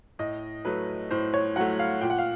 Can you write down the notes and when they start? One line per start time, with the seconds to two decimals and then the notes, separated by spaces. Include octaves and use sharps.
0.19 A2 D#5
0.65 F#3 A3 B4
1.11 A2 C5
1.34 C#5
1.56 F#3 A3 F#5
1.79 F5
2.01 A#2 G5
2.10 F#5
2.18 F5